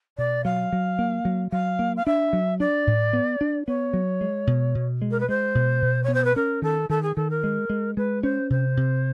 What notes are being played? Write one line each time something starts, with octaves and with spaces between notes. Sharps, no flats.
B2 D5
F#3 F5
F#3
A#3
F#3
F#3 F5
A#3
F5
D4 E5
F#3
D4 D5
A2
B3
D4
B3 C#5
F#3
G#3
B2
B2
G#3
A#4
B4
G#3 C5
B2
B2
B3 C#5
C5
B4
C#4 A#4
D#3 A4
D#3 A4
G#4
D#3 A4
A#4
G#3
G#3
G#3 B4
C#4 C5
C3 C5
C3